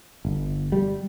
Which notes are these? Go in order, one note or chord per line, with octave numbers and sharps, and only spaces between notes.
G1
G3